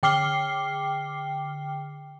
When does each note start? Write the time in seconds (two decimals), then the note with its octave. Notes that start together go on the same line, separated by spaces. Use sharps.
0.03 D3 G5 D6 F6 C7 G7